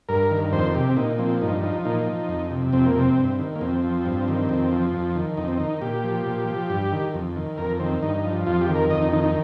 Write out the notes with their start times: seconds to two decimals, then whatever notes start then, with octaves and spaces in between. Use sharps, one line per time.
0.09 G2 A#4
0.31 D#3
0.53 F2 C5
0.75 C3 G4
0.89 C4
0.97 A#2 D#4
1.19 F3 C4
1.41 G2 D#4
1.63 F3 D#4
1.85 A#2 D#4
2.06 F3
2.29 F2
2.51 C3
2.73 F2 C4
2.86 A#3
2.95 C3 C4
3.17 G2
3.39 D#3
3.55 A#3
3.61 F2 C4
3.84 F3
4.06 G2
4.28 D#3
4.49 F2
4.72 F3
4.93 F2
5.15 D#3
5.37 F2 D#4
5.48 C4
5.57 D#3 D#4
5.82 A#2 G4
6.04 F3
6.26 A#2
6.48 F3
6.70 G2
6.92 D#3
7.14 F2
7.36 D#3
7.58 F2 A#4
7.80 D#3 C4
8.02 G2 D#4
8.24 F3
8.46 F2 F4
8.61 G4
8.68 D#3
8.75 A#4
8.91 F2 D#5
9.02 D#4
9.12 D#3 D#4
9.24 D#4